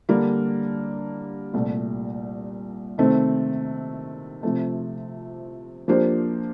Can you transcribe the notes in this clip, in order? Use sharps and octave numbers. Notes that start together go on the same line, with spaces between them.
D3 G3 A#3 D4
C2 A#2 A3
C3 D#3 A3 C4
C3 F3 A3
F3 A#3 D4 G4 C5